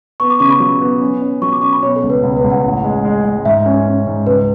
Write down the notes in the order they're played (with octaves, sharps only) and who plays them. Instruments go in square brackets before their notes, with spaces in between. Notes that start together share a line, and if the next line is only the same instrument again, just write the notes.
[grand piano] B3 [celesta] C#6
[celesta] D6
[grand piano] C#3 [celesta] C#6
[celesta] B5
[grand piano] F#3
B3
C#4
C#4
[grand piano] F#3 [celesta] C#6
[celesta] D6
[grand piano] C#4 [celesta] C#6
[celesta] B5
[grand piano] B2 [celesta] C#5
[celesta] A4
[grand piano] C#2
[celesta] B4
[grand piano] C#2 [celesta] B4
[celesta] B4
[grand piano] C#2
[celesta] F#5
[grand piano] A1
G#3
G#3
G#3
[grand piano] G#2 [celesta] E5
[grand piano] C#4
C#4
G#2
[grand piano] C#2 [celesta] B4